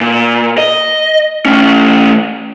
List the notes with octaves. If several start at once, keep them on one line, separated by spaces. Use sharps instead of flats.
A#2
D#5
A3 C#4